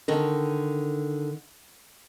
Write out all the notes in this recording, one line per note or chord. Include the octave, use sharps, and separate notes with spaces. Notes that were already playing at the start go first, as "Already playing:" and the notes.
D3 D#3 A#4